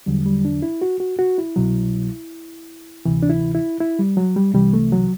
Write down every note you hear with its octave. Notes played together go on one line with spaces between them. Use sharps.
E2 D3 F#3 G3
G3
D4
E4
F#4
F#4
F#4
E4
C2 B2 F#3
D2 C3 E3
D4
E4
E4
E4
G3
F#3
G3
C2 C3 E3 G3
A3
F#3